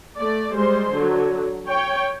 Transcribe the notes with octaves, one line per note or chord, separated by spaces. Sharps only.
A3 D5
G3 G#3 C5 C6
D3 F#3
C#5 G5